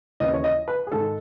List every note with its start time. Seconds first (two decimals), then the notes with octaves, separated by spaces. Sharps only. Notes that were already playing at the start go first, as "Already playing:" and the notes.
0.20 D#2 C#3 E3 D#5
0.34 C#5
0.44 D#5
0.68 B4
0.87 G#4
0.92 G#2 D#3 A4